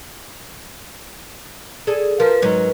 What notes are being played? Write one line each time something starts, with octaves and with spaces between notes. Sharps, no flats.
G#4 A4 D5
F3 A#4 B4
G#2 F#3 C#4